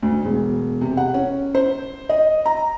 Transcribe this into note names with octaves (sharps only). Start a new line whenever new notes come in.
D2
E1
C3
F#5
C#4
C5
D#5
A#5